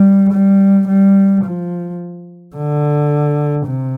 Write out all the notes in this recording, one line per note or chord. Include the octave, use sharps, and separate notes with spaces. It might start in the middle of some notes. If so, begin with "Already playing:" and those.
Already playing: G3
G3
G3
F3
D3
C3